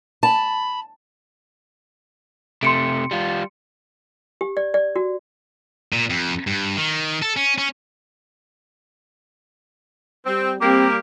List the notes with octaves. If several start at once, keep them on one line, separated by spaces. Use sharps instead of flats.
A5 B5
C3 A3 C6 C#7 D7
G3 F4
G4
D5
D5
F#4
A#2
F2
G2
D#3
A4
C#4
C#4
G3 C4
G3 A#3 C4 G4